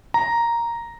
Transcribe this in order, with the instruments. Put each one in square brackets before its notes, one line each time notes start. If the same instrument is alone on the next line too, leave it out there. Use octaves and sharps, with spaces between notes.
[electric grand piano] A#5